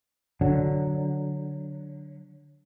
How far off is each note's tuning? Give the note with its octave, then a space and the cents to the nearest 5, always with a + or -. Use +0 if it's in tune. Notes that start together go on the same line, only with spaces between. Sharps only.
D3 +0 F#3 +0 D4 +0